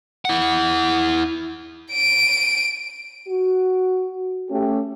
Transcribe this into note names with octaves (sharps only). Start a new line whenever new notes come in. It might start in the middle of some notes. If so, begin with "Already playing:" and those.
E4 F#5
D7 D#7
F#4
A3 C#4 G4